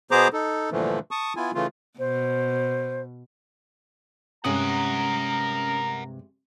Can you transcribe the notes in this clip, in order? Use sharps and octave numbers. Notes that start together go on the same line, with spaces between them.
B2 B3 G#4 C5 A#5 D6
D#4 A4
G2 A#2 D3 E3 F3 A3
A5 C#6 D#6
B3 E4 F4 G#5
C#3 E3 A3 F4
B2 C5
G2 C3 G#3 C#4 A#4 F#5 A#5 D#6